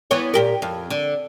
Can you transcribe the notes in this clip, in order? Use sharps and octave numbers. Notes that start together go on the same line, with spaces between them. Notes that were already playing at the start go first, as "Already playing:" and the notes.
E3 B3 C#5
A#2 G4 A#4
F2
D3